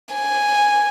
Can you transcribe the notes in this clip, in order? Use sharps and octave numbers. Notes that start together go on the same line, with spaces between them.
G#5